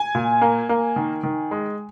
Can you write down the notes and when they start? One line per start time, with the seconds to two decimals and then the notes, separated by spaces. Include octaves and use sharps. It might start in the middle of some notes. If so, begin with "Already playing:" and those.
Already playing: G#5
0.15 A#2
0.42 A#3
0.69 A#3
0.96 D#3
1.24 D#3
1.51 G#3